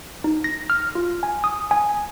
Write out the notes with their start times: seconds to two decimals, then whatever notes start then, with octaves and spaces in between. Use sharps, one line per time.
0.24 D#4
0.44 A#6
0.70 F6
0.95 F4
1.23 G#5
1.44 D#6
1.71 G#5